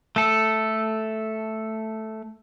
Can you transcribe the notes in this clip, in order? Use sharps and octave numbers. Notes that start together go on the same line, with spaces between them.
A3 A4